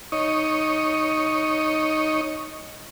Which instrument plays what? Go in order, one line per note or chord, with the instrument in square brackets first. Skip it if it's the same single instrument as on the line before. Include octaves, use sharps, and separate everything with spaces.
[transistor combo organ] D#4 C#5